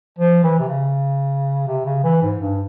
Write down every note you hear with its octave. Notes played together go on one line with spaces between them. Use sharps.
F3
E3
C3
C#3
C3
C#3
E3
G#2
G2